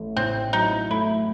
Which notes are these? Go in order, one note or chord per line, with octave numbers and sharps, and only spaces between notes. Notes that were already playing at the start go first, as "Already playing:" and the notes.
Already playing: A1 A3
A2 C4
F#3 D#4
A3 E4